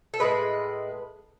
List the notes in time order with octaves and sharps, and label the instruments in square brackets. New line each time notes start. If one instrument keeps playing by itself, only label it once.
[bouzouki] A4
A2 G#3 B4